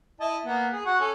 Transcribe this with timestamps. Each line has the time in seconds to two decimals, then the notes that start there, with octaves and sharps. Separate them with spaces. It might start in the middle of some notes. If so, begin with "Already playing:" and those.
0.20 E4 D#5 A5
0.44 A#3 B3
0.72 G#4
0.86 F#4 F#5 C#6
1.00 C#4 A4